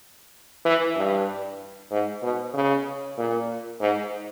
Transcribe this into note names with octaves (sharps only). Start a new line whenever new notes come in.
E3
G2
G#2
B2
C#3
A#2
G#2